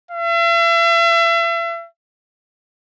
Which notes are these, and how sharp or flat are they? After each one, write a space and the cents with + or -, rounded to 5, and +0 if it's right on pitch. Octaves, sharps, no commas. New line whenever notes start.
E5 +40